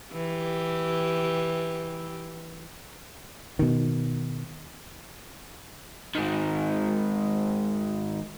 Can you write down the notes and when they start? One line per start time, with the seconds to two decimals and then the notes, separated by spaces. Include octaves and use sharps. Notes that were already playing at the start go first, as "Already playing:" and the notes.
0.13 E3 G4
3.59 B2 D#3
6.15 G#2 D#3